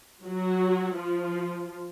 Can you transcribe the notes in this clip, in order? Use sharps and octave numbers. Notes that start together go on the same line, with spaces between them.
F#3 F#4
F3 F4